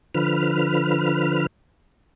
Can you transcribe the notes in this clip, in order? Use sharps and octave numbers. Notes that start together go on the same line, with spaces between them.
D3 F3 B4 F6